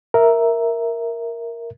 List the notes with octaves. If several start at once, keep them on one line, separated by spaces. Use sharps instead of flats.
A#4 E5